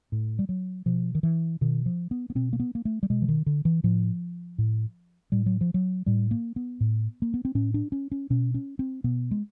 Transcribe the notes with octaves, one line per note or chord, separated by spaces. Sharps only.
A2
G3
F#3
B2 F3
D#3
E3
B2 D#3
F3
B3
B3
B2 C4
A#3
B3
A#3
A3
G3
B2 G#3
E3
D#3
D3
E3
A2 F3
A2
A2 G3
F#3
F3
F#3
A2 G3
A#3
B3
A2
A#3
B3
C4
A2 C#4
D4
C#4
C#4
B2 C#4
C#4
C4
B2 B3
G#3